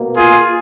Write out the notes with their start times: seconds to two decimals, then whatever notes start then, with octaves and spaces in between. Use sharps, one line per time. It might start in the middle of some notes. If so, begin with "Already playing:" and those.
Already playing: B2 A#3
0.16 F4 G#4